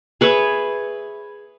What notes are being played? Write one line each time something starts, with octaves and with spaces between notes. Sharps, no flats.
G#4 B4 C#5 E5